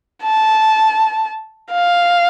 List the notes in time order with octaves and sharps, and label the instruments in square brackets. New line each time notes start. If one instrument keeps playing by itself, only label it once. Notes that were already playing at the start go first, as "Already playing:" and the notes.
[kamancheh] A5
F5